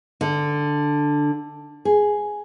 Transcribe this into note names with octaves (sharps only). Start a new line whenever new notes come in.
D3
G#4